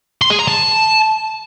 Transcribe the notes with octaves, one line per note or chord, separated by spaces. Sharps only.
C6
G#4
A#5
A5